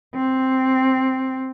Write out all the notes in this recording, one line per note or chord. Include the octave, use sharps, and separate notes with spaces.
C4